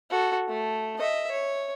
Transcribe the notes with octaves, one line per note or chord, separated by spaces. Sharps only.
F#4 A4
A3
D#5 E5
C#5